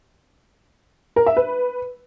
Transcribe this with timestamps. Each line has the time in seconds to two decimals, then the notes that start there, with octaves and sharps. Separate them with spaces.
1.16 A#4
1.26 E5
1.37 B4